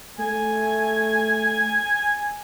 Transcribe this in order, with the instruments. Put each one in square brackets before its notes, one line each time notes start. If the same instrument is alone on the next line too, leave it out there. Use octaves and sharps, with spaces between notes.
[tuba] A3 [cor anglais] G#5